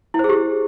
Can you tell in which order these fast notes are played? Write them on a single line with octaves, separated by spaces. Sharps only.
E4 C5 G#4 G4